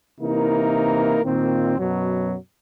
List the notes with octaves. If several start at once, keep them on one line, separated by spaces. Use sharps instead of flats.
C3 E3 A#3 D#4 E4 A#4
A#2 D#3 C4
F#2 B2 F#3